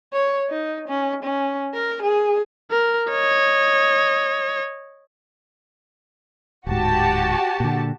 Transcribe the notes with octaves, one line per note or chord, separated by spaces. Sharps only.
C#5
D#4
C#4
C#4
A#4
G#4
A#4
C#5 D#5
D1 G#2 F#4 G4 A5
A#2 D3